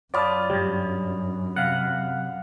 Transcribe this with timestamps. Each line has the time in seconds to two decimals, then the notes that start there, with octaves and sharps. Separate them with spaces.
0.14 F#2 F4 C#5 D5 A5 B5 D#6
0.50 C#2 G2 G3
1.56 C3 F5 F#5